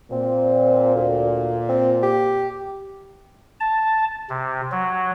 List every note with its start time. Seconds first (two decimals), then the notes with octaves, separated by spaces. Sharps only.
0.12 A#2 C4
0.95 D2
1.69 C4
2.03 G4
3.60 A5
4.30 C3
4.72 F#3